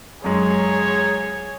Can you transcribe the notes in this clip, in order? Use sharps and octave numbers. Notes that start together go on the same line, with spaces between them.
F#2 G#3 G#4 C#5